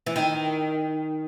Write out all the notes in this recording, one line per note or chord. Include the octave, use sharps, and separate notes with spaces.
E3
D#3